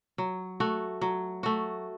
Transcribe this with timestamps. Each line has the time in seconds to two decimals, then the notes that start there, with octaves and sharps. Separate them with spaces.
0.18 F#3
0.60 A3 F#4
1.01 F#3
1.43 A3 F#4